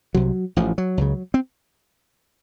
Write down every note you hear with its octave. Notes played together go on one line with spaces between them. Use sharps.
C2 C3 F#3
A1 A2 F3
F#3
C#2 C#3
C4